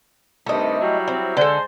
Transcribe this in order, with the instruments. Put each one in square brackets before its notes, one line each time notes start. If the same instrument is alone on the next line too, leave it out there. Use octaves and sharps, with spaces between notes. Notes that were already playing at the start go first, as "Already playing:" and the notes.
[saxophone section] G2 C3 D#3 [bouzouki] A3 D#5
[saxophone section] F#3 G3 E4
[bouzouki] C4
[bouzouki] D3 A4 [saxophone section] G#3 C5